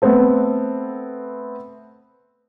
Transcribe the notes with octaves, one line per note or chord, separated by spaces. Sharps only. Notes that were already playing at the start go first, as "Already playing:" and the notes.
A3 B3 C4 A4